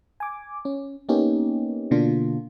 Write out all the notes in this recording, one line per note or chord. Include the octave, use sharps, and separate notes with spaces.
G#5 D6
C#4
A#3 B3 C#4 D#4 G4
B2 D3 A#3 D4 F4